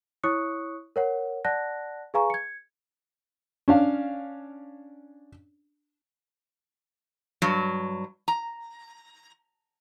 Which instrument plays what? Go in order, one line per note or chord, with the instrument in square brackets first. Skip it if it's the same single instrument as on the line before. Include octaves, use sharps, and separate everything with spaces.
[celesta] E4 C#5 C#6 D#6 F#6 C#7
A#4 C#5 F#5
D5 F#5 A5 F#6 A#6
G#4 B4 F5 G#5 A#5 C#6
G#6 C#7
[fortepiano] C#4 D4 F5
[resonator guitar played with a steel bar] G2 F#3
A#5